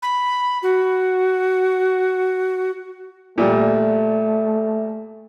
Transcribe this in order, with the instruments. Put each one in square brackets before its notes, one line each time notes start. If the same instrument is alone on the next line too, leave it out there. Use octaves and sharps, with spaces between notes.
[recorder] B5
F#4
[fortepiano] A#2 G3 [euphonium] A3